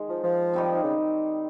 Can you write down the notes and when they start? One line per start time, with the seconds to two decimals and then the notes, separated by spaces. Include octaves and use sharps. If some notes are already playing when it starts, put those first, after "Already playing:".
Already playing: D#3 G#3 D#4
0.09 F3
0.23 F3
0.53 D#3 G3 C4 D#4
0.83 C#3